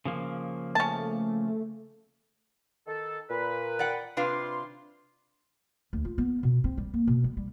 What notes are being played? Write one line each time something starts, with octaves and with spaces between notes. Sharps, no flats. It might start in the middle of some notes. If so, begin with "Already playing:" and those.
C#3 F3 A#3
A3 C#4 A5
D#3 A4
A#2 B4
D5 F#5 G5
C3 D4 F4 B4 C6
D2
F4
B3
B2
C4
G3
A#3
B2
G3
G3